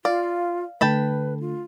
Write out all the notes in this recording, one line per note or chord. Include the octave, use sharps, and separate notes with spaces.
F4 D5 F5
D3 A3 B4 G5 A5 B5
F4